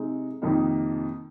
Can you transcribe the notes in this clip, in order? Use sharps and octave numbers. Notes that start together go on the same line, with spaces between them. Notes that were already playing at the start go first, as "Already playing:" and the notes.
Already playing: C3 G#3 D#4
F2 C3 D#3 A#3 D#4